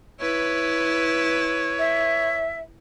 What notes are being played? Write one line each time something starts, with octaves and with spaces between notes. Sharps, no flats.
E4 B4 C#5
E5